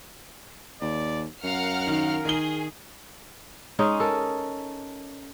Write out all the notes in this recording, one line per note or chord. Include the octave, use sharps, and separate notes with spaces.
D#2 D5
F#2 A#4 F5 F#5 F6
D#3
D#3 G#4 G7
G#3 C#4 D#4
A4 A#4